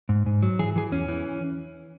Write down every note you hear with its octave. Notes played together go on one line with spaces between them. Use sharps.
G#2
G#2
F#3
E3 G#4
E3 G#4
E2 C#4
E3